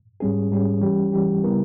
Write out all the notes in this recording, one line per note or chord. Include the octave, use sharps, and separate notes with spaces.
G#2 G3 C#4 G#4
G#2 G3 C#4 G#4
E3 G3 C#4 G4
E3 G3 C#4 G4
C#3 G3 B3 E4 A#4